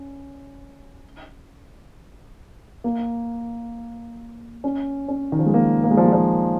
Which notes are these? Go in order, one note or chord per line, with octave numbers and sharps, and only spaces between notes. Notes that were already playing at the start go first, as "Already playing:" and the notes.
Already playing: C#4
A#3
C#4
C#4
D#3
F3
G#3
A#3
A#3
G#3
F3
G#3
F3